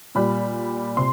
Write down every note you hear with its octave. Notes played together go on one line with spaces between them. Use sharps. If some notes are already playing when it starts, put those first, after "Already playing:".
A#2 G3 B5
C3 C6